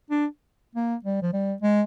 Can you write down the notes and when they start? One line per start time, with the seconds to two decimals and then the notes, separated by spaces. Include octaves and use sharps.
0.10 D4
0.75 A#3
1.04 G3
1.22 F3
1.33 G3
1.62 G#3